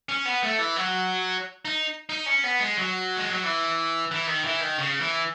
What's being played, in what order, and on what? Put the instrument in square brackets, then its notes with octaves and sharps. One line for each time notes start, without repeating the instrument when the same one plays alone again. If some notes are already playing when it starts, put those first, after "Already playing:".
[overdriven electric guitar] C#4
B3
A3
E3
F#3
D#4
D#4
C#4
B3
G#3
F#3
G#3
F#3
E3
E3
D#3
E3
D#3
C#3
E3